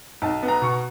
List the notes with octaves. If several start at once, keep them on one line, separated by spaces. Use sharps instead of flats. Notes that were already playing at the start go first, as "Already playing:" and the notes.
B1 A5
B3
A#5
B2 C#6